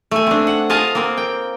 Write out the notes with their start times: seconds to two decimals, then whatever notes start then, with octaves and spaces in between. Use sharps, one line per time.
0.11 A3 G#5
0.27 C4 D4
0.47 F#5
0.70 F4 D#5 F5 G#5 A5
0.95 A#3 C4
1.17 G5